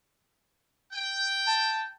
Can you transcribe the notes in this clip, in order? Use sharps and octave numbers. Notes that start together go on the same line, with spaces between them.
G5
A5